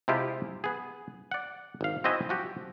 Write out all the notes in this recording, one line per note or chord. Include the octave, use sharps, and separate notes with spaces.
C3 G#3 E4 F4 G4
B3 G#4
D5 F#5
G#1 F5
C4 E4 F#4 D#5 E5 G#5
F3 F#4 G4